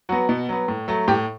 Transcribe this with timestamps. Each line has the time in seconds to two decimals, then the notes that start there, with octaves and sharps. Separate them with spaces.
0.09 F#3 B3 F#4
0.29 B2
0.49 F#3 B3
0.68 A2
0.88 F#3 A3
1.08 A2 G4